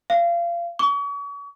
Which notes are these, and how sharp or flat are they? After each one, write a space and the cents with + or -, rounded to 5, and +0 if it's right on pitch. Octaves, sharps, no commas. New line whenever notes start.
F5 -30
C#6 +40